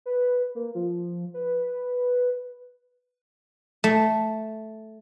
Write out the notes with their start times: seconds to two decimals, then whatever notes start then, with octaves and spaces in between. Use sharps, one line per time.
0.06 B4
0.55 A#3
0.75 F3
1.34 B4
3.84 A3